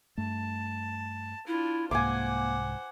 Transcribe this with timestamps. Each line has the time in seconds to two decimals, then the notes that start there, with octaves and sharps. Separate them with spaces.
0.18 G2 A3 A5
1.47 D4 E4 F4
1.91 C2 G#2 A#3 C5 F#5 G#5 D6